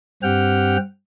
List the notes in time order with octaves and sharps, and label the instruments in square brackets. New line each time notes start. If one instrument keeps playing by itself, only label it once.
[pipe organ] G2 C4 G4 F#5 G5 F6